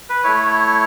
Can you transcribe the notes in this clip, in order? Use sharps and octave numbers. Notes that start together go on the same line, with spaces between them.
B4
A3 E4 C#5